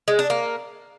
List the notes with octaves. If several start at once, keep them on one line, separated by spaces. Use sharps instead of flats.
G#3
D4
A#3